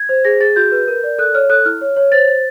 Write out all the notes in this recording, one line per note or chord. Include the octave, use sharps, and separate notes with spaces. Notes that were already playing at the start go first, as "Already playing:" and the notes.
Already playing: G#6
C5
G#4 A#6
G#4 A6
F#4 G6
B4
A#4
D5
A4 F#6
C#5 F6
A4 F#6
E4 F6
C#5
C#5
C5 A6
C5